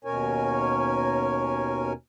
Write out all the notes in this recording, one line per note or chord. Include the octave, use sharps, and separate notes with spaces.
D#2 B2 C#4 A#4 C#5 G#5